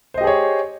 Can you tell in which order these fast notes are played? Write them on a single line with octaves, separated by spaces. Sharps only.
C5 D#5 G4 G#4 C#5